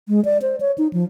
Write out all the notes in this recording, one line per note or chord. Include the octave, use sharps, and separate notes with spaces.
G#3
D5
C5
C#5
D#4
F3